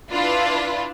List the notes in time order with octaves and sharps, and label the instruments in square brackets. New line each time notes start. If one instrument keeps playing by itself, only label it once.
[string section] D4 E4 F4 B4